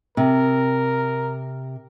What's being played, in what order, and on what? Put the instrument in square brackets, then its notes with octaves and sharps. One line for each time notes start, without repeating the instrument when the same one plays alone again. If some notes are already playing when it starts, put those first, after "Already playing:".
[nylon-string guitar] C3 [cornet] A#4